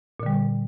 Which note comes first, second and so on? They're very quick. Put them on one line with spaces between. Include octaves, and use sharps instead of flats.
A#2 D3 G3